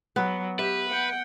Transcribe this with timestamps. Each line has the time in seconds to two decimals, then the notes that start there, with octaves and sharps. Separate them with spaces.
0.16 F#3 B3 B4
0.59 G4 B4 E5
0.90 F#5 G5